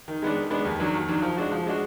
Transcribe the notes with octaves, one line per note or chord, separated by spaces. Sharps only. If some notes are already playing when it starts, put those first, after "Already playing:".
D#3
G#3 B3 D4
D#3
G#3 B3 D4
D#2
D#3 F#3 D4
D#2
D#3 F#3 D4
F3
G#3 D4 F#4
F3
G#3 D4 F#4